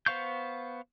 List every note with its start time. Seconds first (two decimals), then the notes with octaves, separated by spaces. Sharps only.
0.06 B3 C5 F5 C#6 G6